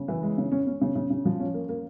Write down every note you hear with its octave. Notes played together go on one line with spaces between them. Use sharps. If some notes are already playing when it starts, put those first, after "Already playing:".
Already playing: C#3
E3
G#3
C#3
C#4
C#4
C#3
C#3
C#3
F3
C#4
A#3
A#3